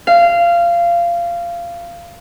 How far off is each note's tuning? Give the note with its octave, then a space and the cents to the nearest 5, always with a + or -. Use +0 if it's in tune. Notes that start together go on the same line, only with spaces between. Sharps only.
F5 -20